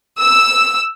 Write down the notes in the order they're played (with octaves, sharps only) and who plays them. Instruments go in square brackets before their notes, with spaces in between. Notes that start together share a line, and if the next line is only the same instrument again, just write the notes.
[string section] E6